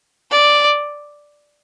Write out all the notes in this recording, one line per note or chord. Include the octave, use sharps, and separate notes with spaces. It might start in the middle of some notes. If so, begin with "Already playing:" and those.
D5